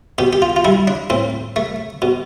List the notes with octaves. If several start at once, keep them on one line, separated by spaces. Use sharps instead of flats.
B2 G4
G4
F4
F4
G3 E4
D4
A2 C4
A3
B2